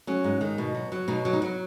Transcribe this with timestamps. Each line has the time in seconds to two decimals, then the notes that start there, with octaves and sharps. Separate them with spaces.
0.07 F#3 C#4
0.24 G#2
0.41 D#3
0.58 B2
0.75 F#3
0.92 F#3
1.08 B2 D#4
1.25 F#3
1.33 D#4
1.42 F#3